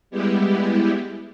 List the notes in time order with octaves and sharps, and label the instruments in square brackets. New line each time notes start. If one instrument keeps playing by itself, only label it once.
[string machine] G3 G#3 B3 E4 G4